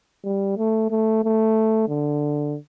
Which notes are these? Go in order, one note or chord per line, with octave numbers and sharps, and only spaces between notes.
G3
A3
A3
A3
D3